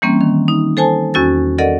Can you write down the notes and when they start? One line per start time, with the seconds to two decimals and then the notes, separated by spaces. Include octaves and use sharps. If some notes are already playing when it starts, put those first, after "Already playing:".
0.02 E3 G3 A#3 C4 C#4
0.21 D#3
0.48 D#4
0.77 A4 C5 G#5 A5
1.14 E2 C#4 F#4 E6 A6
1.58 A4 A#4 D5 D#5 F#5